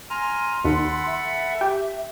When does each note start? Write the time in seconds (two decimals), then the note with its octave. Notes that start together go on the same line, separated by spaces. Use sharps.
0.10 G#5 A#5 C6 F6
0.64 D#2 A4 F#5 B5
1.07 E5
1.61 G4